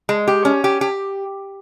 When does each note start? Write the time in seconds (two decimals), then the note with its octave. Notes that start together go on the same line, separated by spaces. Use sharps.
0.09 G#3
0.27 G4
0.45 C#4
0.64 G4
0.81 G4